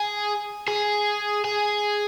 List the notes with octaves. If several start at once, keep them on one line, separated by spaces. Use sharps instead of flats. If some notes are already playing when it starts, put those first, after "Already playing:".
Already playing: G#4
G#4
G#4